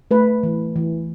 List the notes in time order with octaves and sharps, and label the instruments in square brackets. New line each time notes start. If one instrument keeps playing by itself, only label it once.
[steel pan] A3 B4
E3
E3